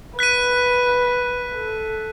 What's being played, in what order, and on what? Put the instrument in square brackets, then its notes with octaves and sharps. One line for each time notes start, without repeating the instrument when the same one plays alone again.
[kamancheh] B4 [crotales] F#6 B6 D#7
[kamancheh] A4